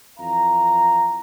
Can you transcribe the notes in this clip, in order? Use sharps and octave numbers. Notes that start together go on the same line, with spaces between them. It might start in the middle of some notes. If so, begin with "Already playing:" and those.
F2 E3 F5 A#5